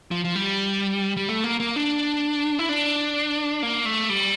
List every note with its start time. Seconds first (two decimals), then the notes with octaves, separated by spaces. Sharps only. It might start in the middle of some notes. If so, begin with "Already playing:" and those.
0.11 F3
0.25 F3
0.36 G3
1.17 G3
1.29 A3
1.44 A#3
1.60 A#3
1.76 D4
2.59 E4
2.69 D4
3.63 A#3
3.86 A3
4.10 G3